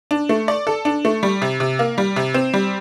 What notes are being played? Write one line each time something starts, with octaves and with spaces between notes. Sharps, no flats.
D4
A3
D5
A4
D4
A3
G3
C3
C3
A#3
G3
C3
C4
G3